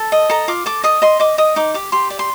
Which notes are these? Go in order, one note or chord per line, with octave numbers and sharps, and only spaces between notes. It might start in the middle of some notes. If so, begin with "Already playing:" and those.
Already playing: A4 A5
D#5
A4 A#5
F4 D6
A4 D6
D#5 D#6
D#5 C6
D#5 D6
D#5 D#6
D#4 D6
G4 D6
G4 C6
D5
C6